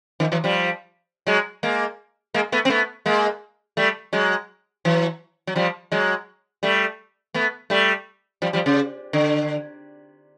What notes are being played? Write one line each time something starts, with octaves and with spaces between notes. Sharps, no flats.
D#3 F3
E3 F#3
F3 G3
F#3 G#3
G#3 A#3
G#3 A#3
A3 B3
C4
A3 B3
G#3 A#3
G3 A3
F#3 G#3
E3 F#3
F#3
F3 G3
F#3 G#3
G3 A3
A3 B3
G3 A3
F3 G3
F3 G3
C#3
D3